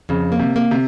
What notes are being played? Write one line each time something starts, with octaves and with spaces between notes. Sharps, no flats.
F2 C#3
A#3
C3
A#3
C3